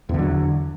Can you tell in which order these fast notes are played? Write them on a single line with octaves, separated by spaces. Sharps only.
E2 D3 F#3